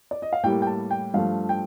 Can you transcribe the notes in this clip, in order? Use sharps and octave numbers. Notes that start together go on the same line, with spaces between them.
D5
D#5
F5
A2 G3 A#3 G5
G5
A5
G5
G2 F3 A3 F5
G5